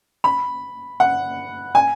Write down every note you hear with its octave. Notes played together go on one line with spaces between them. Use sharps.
B5
F#5
G#5